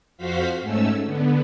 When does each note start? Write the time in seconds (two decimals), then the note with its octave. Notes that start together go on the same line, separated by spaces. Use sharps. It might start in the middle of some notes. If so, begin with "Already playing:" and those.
0.17 F2 F#4 C5 F5 B6
0.61 G#2 A3 C#4 E6
1.05 D3 B3